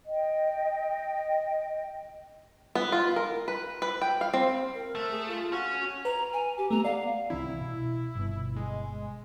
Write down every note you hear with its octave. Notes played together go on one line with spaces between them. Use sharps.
D#5 G5
B3
F4
A#4
B4
B4
G5
F5
C4
A#4
A3
G#4
F4
C#4 F#4
B4 A#5
G#5
G4
A3 B3 A#5
D5 F5 F#5
C2 E3 C4 E4
B2
G1 B2
G#3